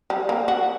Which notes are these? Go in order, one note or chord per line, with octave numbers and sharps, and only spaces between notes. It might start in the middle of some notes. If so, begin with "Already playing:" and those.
G3
A#3
F#4